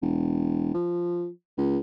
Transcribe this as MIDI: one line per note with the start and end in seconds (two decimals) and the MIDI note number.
0.02 0.73 28
0.74 1.28 53
1.58 1.78 37